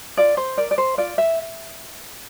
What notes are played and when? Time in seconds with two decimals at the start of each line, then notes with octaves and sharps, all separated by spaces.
0.17 F4 D5
0.37 C5
0.57 A#4 D5
0.71 D5
0.78 C5
0.98 F4 D5
1.18 E5